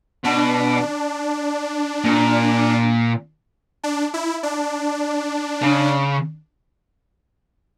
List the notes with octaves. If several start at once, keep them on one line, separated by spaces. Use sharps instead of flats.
B2 D4
A#2
D4
E4
D4
C#3